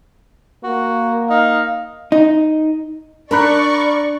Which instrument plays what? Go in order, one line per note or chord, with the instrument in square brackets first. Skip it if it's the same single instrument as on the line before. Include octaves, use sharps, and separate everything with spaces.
[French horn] A#3 [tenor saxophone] F#4
[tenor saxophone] D#4 [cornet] F5
[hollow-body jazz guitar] D#4
[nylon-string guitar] D4 [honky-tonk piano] A#4 B5 F#6 [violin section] D5 C#6